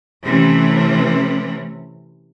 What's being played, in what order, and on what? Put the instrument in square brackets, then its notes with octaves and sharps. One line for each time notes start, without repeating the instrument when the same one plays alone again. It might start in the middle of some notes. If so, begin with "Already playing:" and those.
[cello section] C3 E3 A3 C#4